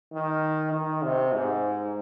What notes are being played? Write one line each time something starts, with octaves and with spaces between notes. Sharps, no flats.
D#3
D#3
C3
G#2